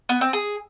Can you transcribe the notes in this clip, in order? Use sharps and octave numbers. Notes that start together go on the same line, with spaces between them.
B3
C4
G#4